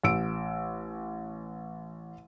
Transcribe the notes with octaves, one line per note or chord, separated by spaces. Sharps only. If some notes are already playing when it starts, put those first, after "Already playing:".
A1 E6 D7